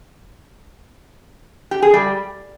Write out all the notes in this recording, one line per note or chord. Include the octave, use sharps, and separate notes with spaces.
G4
G#4
G3